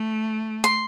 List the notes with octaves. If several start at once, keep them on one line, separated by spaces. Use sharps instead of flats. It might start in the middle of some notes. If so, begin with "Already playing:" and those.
Already playing: A3
C6